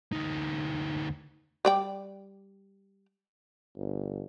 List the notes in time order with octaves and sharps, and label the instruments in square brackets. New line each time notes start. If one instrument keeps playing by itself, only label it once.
[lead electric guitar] D2 D#4
[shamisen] G3 D5 G5
[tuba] G1